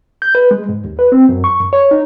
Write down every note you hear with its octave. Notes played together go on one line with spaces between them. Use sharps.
G6
B4
G#3
G#2
D#2
B4
C4
F#2
C#6
F#2
C#5
D#4